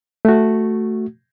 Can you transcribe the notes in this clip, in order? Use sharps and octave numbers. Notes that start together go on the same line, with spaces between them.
A3 F#4